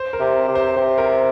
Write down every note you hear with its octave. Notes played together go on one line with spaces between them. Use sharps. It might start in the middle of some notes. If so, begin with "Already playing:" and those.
Already playing: C5
A#4
C3
C3
C5
C3 C5
A#4